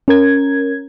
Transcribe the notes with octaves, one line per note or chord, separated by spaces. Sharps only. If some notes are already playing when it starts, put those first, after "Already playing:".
C#4 A#4 G#6